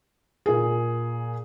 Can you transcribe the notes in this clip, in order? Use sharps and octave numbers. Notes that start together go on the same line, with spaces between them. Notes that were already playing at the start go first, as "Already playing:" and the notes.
A#2 G#4